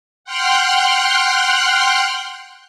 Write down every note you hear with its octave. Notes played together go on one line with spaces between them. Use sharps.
F#5 G5 C6 F6 F#6